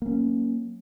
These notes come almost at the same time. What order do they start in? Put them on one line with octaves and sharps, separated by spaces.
A#3 C#4 F#3